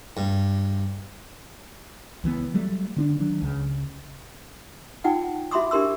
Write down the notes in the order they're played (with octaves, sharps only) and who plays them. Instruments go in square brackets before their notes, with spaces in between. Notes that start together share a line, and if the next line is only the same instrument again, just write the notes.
[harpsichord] G2
[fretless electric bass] C#2 E3 F3 B3
F#3 G3 A3
D3 C#4 D4
D#3 F#3 D4
C#2 C#3
[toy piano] D#4 F4 F#5 G5
F#4 E5 B5 C6 D6 D#6
D4 G4 A#4 C6 E6